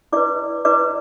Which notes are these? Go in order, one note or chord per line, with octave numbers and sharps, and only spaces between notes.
E4 B4 D5 D6
E4 B4 D5 D6